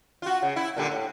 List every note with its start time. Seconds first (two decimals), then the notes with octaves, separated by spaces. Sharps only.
0.22 F4 F#4
0.42 C#3
0.56 E4
0.76 A#2 D3 G3
0.92 A2